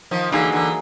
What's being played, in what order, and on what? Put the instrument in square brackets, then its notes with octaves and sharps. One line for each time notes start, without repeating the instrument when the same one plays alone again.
[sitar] D#3 F3
[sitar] D3 E3 [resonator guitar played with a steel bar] F#3 A#3 D#4 G#4
[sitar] D3 E3